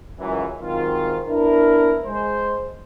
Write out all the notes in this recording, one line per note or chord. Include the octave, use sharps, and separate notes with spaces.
C#2 F#2 E3
G#2 D#3 F#3 C4 F4
B3 D4 E4 A#4
G#3 C5